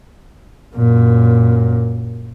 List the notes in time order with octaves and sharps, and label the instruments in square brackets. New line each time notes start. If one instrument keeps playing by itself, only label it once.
[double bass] F#2 A#2